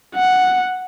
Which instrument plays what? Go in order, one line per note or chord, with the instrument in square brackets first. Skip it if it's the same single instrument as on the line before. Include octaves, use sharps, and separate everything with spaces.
[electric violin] F#5